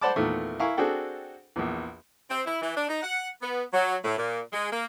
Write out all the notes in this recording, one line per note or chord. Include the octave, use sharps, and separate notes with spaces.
C5 D5 F#5 A5 B5 D6
E2 A#2 D#3 A3
E4 A#4 F5 G#5 C#6
C4 D4 F#4 G#4 A4 G5
A#1 E2
C4
E4
E3
D4
D#4
F#5
B3
F#3
A2
A#2
G#3
A#3